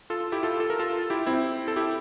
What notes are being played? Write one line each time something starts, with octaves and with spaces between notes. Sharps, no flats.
F4 A4
E4 G4
F4 A4
A4
A#4
F4 A4
E4 G4
C4 E4
A4
E4 G4